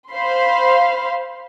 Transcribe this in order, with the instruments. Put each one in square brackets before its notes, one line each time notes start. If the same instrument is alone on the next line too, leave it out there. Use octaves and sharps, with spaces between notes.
[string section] C5 F5 B5 C6